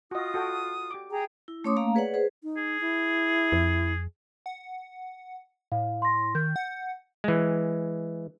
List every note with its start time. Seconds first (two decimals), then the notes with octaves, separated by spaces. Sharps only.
0.11 F4 F#4 D#5 D#6
0.34 F#4 A4 G5
0.91 G4 D6
1.11 G#4 G5 A#5
1.48 E4
1.64 A3 C#4 C#5 C6 D6 D#6
1.77 A3 A#3 F5 A#5
1.95 G#4 B4 C#5 D5 F#5
2.14 G#4 B4 C5
2.43 D#4
2.57 G#4
2.81 E4
3.52 F2
4.46 F#5
5.72 A2 F5
6.02 C6 A#6
6.35 D#3 G6
6.56 F#5
7.24 E3 G#3